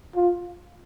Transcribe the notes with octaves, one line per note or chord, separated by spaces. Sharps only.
F4